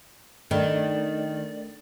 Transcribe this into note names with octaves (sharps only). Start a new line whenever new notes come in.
D#3 A3 D4 A#4 D5